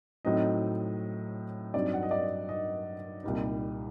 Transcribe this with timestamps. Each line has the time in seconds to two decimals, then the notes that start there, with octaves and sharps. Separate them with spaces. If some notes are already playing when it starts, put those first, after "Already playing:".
0.25 A2 F#3 C4 D#4 D#5
1.74 G2 F#3 C4 D#4 D5
1.94 F#5
2.03 D#5
2.11 D5
2.49 D#5
3.23 C2 A#2 G3 A#3 D#4